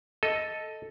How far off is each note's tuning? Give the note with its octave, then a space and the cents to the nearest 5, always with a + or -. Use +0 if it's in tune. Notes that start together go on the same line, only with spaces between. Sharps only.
A4 +0 D#5 +10